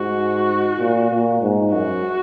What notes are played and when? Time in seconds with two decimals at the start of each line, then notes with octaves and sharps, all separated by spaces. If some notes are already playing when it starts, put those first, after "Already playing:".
Already playing: G#2 F#4
0.79 A#2
1.11 A#2
1.42 G#2
1.73 F#2 F#4